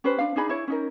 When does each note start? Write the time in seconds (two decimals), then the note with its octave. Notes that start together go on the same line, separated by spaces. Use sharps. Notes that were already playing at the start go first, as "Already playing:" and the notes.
0.04 C#4 G4 B4 C5
0.19 D4 F5
0.36 D4 D#4 G#4 B5
0.49 E4 C#5
0.68 C#4 D#4 A#4